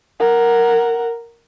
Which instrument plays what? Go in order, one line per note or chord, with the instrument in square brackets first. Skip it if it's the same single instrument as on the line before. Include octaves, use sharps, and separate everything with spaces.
[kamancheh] A#4 F#5